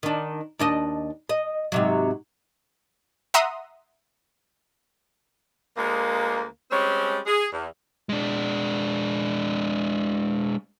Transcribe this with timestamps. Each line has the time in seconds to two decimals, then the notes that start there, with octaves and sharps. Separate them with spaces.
0.03 D#3 D4
0.59 D#2 D4 D#5
1.29 D#5
1.72 G#2 C3 F#3
3.34 E5 F#5 A#5 C6 D#6
5.77 D2 G#3 A#3
6.70 G3 G#3 C4 C#4
7.26 G#4
7.52 E2
8.09 G#3 D4